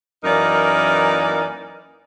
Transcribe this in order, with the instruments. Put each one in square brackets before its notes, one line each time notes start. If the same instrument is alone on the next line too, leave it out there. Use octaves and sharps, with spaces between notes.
[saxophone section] F#2 E3 A#3 D#4 A#4 D5